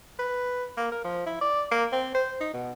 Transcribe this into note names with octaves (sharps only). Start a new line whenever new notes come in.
B4
A#3
A#4
F3
E4
D5
A#3
C4
C5
D#4
B2